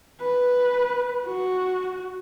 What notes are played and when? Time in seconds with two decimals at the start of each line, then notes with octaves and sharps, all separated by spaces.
0.21 B4
1.26 F#4